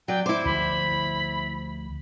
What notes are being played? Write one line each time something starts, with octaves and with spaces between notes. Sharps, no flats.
F#3 D5 G5
E4 C5 D6
D2 F3 B5